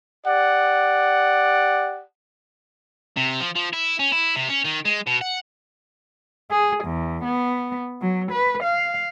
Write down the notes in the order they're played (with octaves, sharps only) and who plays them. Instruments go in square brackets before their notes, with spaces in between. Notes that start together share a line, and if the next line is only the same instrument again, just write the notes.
[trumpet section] G4 D5 F#5
[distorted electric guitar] C3
F3
F3
E4
C#4
E4
C3
C#4
D#3
G#3
B2
F#5
[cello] G#4
E2
B3
F#3
B4
F5